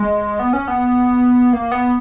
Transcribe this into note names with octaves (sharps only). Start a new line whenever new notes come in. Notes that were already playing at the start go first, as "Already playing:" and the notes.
Already playing: G#3
B3
C#4
B3
A#3
B3